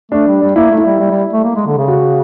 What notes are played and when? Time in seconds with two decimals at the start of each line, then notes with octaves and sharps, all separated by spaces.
0.11 A3 D4
0.27 G3
0.42 G3
0.56 A#3 E4
0.70 A3
0.78 E4
0.85 G3
1.00 G3
1.11 G3
1.33 A3
1.44 A#3
1.56 G#3
1.66 D3
1.77 C#3
1.88 F#4